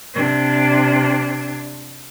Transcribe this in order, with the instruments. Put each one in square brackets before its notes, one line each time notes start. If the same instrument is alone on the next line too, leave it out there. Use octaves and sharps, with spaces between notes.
[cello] C3 D4